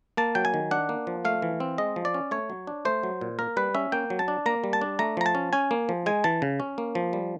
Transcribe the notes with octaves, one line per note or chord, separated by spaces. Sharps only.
A#3 A5
F#3 G5
G#5
D#3
D4 F#5
A#3
F3
A3 F5
E3
C4
G#3 D#5
F3
D5
C#4
A3 C#5
F#3
D4
A3 C5
F#3
A#2
A#3 A#4
G3 B4
C#4 E5
A#3 G5
F#3
A5
D4
A#3 A#5
G3
A5
D4
A3 A#5
F3 A#5
A5
C#4
C#4 G#5
A#3
F3
G#3 G#5
E3 A5
C#3
C#4
A#3
F3
G3